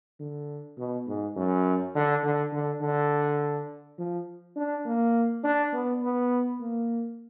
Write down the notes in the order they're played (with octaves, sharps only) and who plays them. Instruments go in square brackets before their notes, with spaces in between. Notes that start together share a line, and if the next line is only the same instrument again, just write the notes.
[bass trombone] D3
B2
G#2
F#2
D3
D3
D3
D3
F3
D4
A#3
D4
B3
B3
A#3